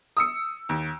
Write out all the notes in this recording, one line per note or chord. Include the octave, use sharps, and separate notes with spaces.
D#6 E6 C#7
D#2